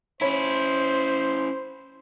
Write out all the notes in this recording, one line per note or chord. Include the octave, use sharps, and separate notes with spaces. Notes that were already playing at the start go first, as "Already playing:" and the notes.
C#4 E4 C5 C#5 B5 B6